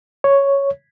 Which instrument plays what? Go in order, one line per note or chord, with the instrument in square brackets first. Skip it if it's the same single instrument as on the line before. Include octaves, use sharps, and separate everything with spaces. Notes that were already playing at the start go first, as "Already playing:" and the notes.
[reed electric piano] C#5